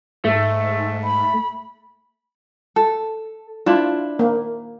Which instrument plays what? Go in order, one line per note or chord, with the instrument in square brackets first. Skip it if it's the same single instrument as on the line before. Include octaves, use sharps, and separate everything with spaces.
[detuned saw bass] G#2 [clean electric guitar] A3
[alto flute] B5
[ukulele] A4
[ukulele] D4 E4 [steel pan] F4
[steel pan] A#3